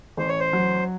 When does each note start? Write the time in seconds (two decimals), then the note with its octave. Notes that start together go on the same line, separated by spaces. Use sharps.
0.17 A1 C5
0.29 C#5
0.39 C5
0.53 F#3